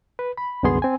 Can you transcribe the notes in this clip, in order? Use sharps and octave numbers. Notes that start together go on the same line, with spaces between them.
B4
B5
C2 F#2 D3 B3 G#4 C6
C4 G#5